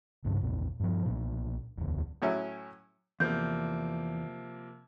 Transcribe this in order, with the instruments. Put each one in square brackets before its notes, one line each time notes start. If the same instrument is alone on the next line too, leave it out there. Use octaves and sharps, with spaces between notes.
[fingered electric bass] C2 G2 C#3
A#1 E2 A#2
G2 F3
B1 A#2
E1 D2
[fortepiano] A2 F#3 C#4 E4
[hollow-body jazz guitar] E2 [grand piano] C3 F3 A#3 [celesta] G6